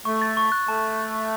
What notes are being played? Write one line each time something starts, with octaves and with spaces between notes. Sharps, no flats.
A3 C#6
A6
C#6
F#6
A3 A5